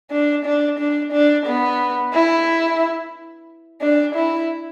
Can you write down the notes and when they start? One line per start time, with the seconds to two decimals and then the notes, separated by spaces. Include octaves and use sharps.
0.11 D4
0.45 D4
0.79 D4
1.12 D4
1.46 B3
2.14 E4
3.82 D4
4.15 E4